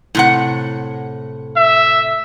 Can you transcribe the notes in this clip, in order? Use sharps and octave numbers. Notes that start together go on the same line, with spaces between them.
A2 C3 F#5
E5